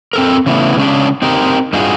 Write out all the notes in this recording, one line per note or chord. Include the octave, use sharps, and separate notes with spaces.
C4 A4 A#4
C#3 E3 A3 B3
C#3 G#3 C#4 D4
C4 D#4 G4 A#4
G2 D#4 F4 F#4 G#4